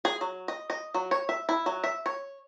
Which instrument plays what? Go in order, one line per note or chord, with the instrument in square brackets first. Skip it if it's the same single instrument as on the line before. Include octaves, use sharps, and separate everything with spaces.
[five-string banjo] G#4
F#3
D#5
D#5
F#3
C#5
E5
E4
F#3
E5
C#5